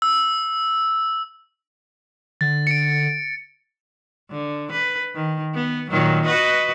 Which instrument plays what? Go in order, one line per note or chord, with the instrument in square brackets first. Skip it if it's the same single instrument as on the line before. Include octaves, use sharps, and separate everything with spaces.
[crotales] E6
[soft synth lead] D3 [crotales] A6
[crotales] C#7 D7
[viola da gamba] D3
B4
D#3
B3
A#2 D#3 F#3
F#4 B4 D#5